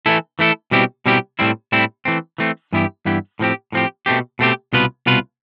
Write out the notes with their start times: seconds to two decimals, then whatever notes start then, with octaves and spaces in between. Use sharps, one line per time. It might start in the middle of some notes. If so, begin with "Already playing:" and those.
0.06 E3 A3 E4 A4
0.39 E3 A3 E4 A4
0.71 B2 G3 C4 E4 G4
1.06 B2 G3 C4 E4 G4
1.39 A2 G3 C4 E4
1.72 A2 G3 C4 E4
2.05 E3 A3 C4
2.38 E3 A3 C4
2.73 G2 E3 B3 E4 G4
3.05 G2 E3 B3 E4 G4
3.39 A2 F3 C4 G4
3.72 A2 F3 C4 G4
4.06 B2 A3 C4 G4
4.39 B2 A3 C4 G4
4.73 C2 B2 B3 F4 B4
5.06 C2 B2 B3 F4 B4